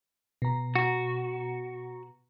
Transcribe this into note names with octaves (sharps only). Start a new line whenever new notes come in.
B2 A#5
F#4